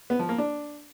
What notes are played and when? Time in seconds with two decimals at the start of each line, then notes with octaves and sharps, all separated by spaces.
0.10 B3
0.19 F3
0.29 A#3
0.38 D4